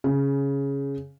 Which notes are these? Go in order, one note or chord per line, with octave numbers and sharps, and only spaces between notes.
C#3